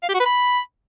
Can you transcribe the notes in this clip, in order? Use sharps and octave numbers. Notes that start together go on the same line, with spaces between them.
F5
G4
F#4
B4
B5